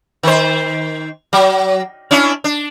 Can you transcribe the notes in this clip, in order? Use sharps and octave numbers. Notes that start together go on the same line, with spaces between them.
D#3 C5
F#3
C#4 D4 E4
D4